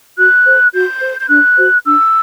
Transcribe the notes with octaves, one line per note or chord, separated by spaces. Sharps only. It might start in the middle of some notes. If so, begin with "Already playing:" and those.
F#4 F#6
A4 C5
F#4 G6
A4 C5
G6
D4 F#6
F#4 C5
D4 E6